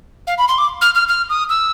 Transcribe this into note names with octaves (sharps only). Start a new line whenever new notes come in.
F5
B5
C6
D6
F6
F6
F6
D#6
E6